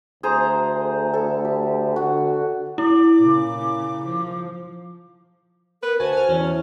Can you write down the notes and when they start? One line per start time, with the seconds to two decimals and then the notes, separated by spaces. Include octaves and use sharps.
0.23 D2 G#4 C5 A#5
1.14 A4
1.45 G4
1.96 D3 F#4
2.78 E4 D6
3.18 A#2 C#3
4.05 F3
5.83 A#4 B4
6.00 D2 F#4 C5 G#5 A5
6.13 G#5 F6
6.29 E2 C#4
6.46 E4